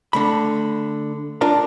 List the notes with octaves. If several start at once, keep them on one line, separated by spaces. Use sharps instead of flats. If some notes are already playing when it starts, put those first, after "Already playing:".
D3 A3 B5
D4 F4 A#4 D5 A#5